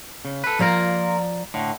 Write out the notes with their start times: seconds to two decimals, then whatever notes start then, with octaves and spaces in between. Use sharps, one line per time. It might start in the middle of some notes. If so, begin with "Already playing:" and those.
0.25 C#3
0.44 A4 B4
0.59 F3 A#3 F4 A#4 D5 A#5
1.54 A2 D3